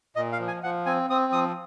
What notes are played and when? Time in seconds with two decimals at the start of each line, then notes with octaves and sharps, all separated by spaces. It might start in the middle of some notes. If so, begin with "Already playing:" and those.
0.16 A#2 D#5
0.32 F5
0.39 F3
0.48 G#5
0.63 F3 F#5
0.86 C4 G#5
1.10 C4 D#6
1.32 F3 D#6